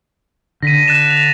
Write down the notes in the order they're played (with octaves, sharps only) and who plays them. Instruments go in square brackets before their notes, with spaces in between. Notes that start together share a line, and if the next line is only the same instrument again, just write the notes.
[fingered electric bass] D3 [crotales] A#6 B6 D#7
[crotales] F#6 A6 E7
F7